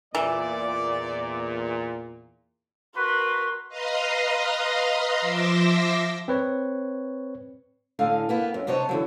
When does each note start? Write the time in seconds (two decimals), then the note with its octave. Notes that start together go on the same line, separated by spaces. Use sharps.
0.15 E2 A#2 E3 D5
2.96 F#4 A#4 B4 C6
3.69 B4 D#5 F5 A#5 C6 D#6
5.21 F3 E5 C6 D6 E6 A#6
6.28 C4 B4 C#5
7.99 A2 D3 F5 G#5
8.29 A#3 B3 B4
8.54 F#2
8.67 C3 B3 D4 C5 C#5 D#5
8.89 D3 E3 F#3